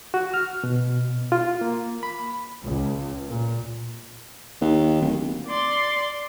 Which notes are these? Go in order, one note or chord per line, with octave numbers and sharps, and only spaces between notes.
F#4
F6
B2
F4
A#3
B5
C#2
A#2
D#2
D1
D5 C6